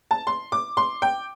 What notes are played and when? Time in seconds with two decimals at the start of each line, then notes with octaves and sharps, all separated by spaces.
0.11 A5
0.27 C6
0.52 D6
0.77 C6
1.02 G5